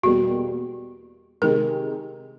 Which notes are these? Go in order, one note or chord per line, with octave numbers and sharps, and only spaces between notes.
E2 B2 G3 A#3 F#4
C3 D#3 G#3 A#4